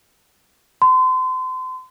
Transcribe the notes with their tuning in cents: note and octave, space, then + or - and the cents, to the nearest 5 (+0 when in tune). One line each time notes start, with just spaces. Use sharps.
C6 -35